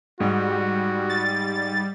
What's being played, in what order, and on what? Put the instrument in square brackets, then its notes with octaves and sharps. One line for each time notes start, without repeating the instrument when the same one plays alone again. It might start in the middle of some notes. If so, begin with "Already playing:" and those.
[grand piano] G#2 [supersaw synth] G3 [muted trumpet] F#4
[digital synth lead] A6